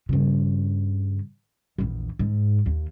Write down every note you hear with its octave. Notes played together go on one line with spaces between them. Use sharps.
G2 C#3
A#1 E2
G#2
D#2